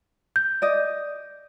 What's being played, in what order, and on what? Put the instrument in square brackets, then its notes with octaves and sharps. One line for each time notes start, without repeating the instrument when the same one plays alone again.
[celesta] G6
[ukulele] D5 D#5